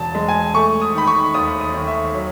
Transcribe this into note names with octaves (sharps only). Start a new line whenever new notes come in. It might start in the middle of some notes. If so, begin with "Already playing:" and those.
Already playing: E1 E2 B2 A5
G#3
G#5
A3 C#6
D#6
D#3 B5
C#6
D#2 D#6
D#6
D#2
E5
F#3